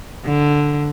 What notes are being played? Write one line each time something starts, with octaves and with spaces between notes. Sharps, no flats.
D3